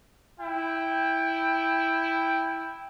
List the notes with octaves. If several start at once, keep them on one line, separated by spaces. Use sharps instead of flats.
E4 G5